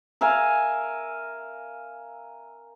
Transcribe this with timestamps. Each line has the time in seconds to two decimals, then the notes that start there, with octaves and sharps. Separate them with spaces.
0.21 A#4 E5 F5 G#5